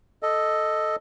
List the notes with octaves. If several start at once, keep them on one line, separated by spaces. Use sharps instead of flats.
A4 D#5